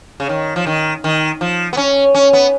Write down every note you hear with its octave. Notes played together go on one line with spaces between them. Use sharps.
C#3
D#3
F3
D#3
D#3
F3
B3
C#4
C#4
B3